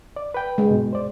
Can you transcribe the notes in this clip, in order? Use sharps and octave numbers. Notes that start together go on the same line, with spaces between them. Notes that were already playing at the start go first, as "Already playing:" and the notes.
D5
B4 G5
G#3
G2 B2
C5 D5